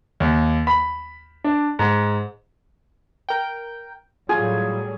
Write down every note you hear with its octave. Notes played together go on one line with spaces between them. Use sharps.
D#2
B5
D4
G#2
A#4 G5
A2 F#3 G3 F4 G#4